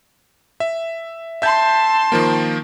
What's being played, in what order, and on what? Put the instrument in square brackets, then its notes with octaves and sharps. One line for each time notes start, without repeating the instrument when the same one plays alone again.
[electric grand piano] E5
[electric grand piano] E5 G6 [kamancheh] A5 C6
[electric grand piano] D#3 F3 A#3